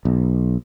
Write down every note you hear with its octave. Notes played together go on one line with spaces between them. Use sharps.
B1